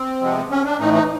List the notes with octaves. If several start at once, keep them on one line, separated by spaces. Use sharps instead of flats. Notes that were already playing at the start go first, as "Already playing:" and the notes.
Already playing: C4
C3 F3 G#3 B3
C#4
D4
A2 E3 A3 D#4
D#4